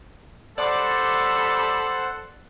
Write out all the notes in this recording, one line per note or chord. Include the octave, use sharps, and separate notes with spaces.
G3 A4 C5 D5 F#5 A5 D6